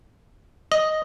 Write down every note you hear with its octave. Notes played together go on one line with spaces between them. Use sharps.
D#5